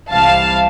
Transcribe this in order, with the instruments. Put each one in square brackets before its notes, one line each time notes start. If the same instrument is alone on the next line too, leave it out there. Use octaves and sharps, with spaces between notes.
[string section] C2 C3 E3 G3 F5 A5